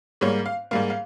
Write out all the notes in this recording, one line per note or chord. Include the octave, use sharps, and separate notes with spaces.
G#2 G3 A#3 C#5
F5
G#2 G3 A#3 F5
F5